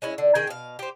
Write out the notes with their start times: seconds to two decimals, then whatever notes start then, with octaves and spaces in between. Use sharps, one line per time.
0.02 G#3 C#4 E4
0.18 D3
0.35 D#3 G#4 G5
0.47 B2 F5
0.79 G4 C5